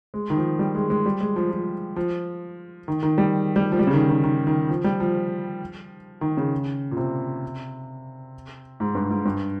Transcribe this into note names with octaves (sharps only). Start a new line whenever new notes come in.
G#3
D#3
F3
G3
G#3
G#3
G3
G#3
F3
F3
F3
D#3
D#3
G3
G3
F3
G3
C#3
D#3
D#3
D#3
D#3
F3
G3
F3
D#3
C#3
A#2
C3
G#2
G2
G#2
G2